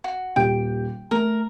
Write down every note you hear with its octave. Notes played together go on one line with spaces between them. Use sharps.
F#4
D#1 G4 G5
A3 A#4